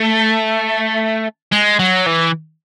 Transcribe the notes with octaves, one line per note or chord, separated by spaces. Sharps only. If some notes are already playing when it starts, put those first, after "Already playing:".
Already playing: A3
G#3
F#3
E3